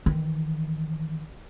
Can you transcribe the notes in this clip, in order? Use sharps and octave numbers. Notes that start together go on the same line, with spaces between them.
D#3 E3